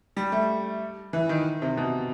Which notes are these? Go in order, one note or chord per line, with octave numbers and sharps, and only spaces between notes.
G3
A3
E3
D#3
C3
B2